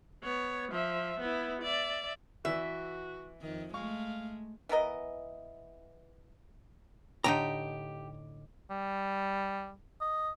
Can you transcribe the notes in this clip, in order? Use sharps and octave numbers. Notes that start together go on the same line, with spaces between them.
B3 C#5
F3 E5
B3 E4
D5 E5
E3 F#4 B4 E5
F2 D#3
G#3 A3 F5 C#6
E3 B3 A#4 D#5
A2 D3 D#4 G4 A#5
G3
D#5